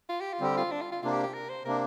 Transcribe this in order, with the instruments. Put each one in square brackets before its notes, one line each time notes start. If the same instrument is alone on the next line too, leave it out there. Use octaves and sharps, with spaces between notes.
[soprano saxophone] F4
G4
F4
[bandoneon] D3 G3 C4 [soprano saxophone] G4
[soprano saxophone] F4
D4
F4
F4
[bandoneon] C3 A#3 D4 [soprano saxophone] F4
[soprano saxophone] G4
G4
A#4
C5
[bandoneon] C3 A#3 D4 [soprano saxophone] A#4